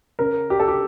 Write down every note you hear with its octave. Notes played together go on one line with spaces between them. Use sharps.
C#3 A#4
G4
A4
G4